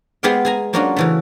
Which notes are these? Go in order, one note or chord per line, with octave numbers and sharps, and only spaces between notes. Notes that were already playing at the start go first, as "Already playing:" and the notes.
G#3 B3 G4 G#4 F5 G5
G#4 G#5 A#5
F#3 A#3 C#4 D4 F4 F#4
C#3 E3 A3